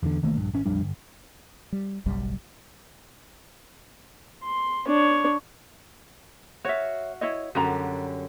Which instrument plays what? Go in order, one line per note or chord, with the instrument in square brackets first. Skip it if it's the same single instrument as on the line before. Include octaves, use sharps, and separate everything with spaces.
[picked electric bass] E2 D3
C2 D#3 A3 A#3
A#1 G2
G#1 C#4
A#1 F2 G3 D4
G1
[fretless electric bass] G3
F#1 B1 F#2 G3
[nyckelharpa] C6
D4 C#5
[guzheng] F#4 F5 [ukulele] C#5 E5
[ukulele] E4 C#5 D#5
[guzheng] F#2 D3 G3 [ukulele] F#4 A#5